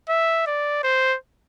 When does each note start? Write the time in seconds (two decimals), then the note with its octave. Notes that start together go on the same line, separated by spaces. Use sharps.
0.09 E5
0.47 D5
0.83 C5